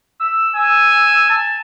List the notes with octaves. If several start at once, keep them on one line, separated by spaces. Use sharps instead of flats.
E6
G#5 E6
A5